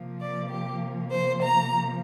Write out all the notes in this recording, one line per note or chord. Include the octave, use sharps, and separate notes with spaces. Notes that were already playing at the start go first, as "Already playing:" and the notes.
Already playing: C3 F3 A#3
D5
G4
C5
A#5